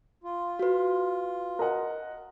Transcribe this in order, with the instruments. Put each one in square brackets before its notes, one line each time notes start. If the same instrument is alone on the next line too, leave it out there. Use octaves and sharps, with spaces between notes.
[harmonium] F4
[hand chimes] F#4 B4
[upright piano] A#4 D#5 F#5